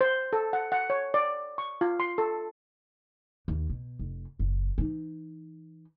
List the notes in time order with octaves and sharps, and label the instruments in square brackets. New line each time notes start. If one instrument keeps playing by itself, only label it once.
[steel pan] C5
A4
F#5
F#5
C#5
D5
C#6
F4
C6
A4
[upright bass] D#2
B2
F1
F#1
E3 D#4